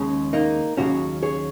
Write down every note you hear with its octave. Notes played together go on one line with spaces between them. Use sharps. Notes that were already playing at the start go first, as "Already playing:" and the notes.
Already playing: D#2 C#3 G#3 C#4
A#3 D#4
D#2 C#3 F#3 C#4 F#4
G#4 C#5